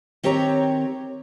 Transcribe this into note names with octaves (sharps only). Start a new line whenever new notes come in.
D#3 C4 G4 C#5 A#5